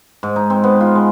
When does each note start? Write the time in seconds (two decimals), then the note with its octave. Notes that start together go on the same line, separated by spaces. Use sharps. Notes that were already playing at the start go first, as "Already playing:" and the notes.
0.23 G#2
0.36 D#4
0.50 C4
0.64 B3
0.81 F4
0.95 G#3